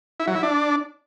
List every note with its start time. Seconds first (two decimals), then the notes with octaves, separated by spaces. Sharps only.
0.20 E4
0.27 F#3
0.35 E4
0.43 D4